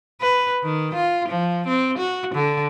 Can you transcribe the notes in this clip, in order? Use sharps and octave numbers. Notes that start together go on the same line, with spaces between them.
B4
D#3
F4
F3
C4
F#4
D3